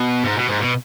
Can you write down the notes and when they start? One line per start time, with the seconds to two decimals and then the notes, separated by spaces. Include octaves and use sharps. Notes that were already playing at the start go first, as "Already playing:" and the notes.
Already playing: B2
0.24 G#2
0.36 B2
0.48 G#2
0.60 B2